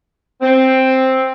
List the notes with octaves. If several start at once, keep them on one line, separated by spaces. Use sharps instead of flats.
C4